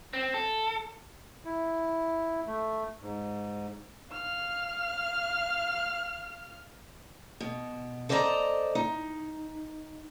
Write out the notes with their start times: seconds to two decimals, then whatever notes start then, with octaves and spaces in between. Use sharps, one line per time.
0.13 C4
0.34 A4
1.45 E4
2.47 A3
3.02 G#2
4.11 F5 F6
7.40 B2
8.09 A4 C5 D5 D#5 F5 A#5
8.75 D#4